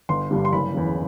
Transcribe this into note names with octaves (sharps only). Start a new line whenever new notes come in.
G1 C6
G2 D3 G3
C6
F#1 B5
E2 C#3